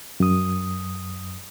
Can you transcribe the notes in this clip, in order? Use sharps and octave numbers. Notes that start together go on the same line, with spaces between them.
F#2 D#6